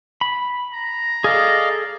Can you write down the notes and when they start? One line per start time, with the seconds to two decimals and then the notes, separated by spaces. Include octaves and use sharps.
0.21 B5
0.74 A#5
1.24 G#4 A4 D5 D#5 F5